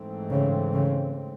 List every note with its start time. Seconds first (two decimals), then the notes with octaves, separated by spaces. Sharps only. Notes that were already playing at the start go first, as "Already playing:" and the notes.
Already playing: G#2 E3 A3 C4
0.31 C#3
0.74 C#3